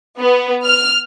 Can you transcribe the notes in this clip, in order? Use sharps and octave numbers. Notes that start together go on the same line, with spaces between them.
B3
F6